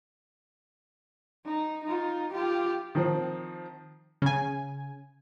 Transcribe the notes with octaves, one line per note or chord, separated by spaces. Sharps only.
D#4
D#4 F4
F4 G4
D#3 F3 C4
C#3 G#5